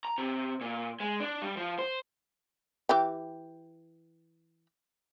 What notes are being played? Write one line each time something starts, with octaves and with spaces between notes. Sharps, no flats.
A#5
C3
A#2
G#3
D4
G3
F3
C5
E3 G4 G5